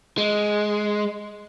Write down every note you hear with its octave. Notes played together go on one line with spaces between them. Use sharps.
G#3